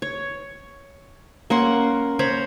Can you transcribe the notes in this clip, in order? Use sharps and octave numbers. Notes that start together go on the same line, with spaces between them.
C#5
A#3 C#4 F#5 C6
C5 C#5 A#5 B5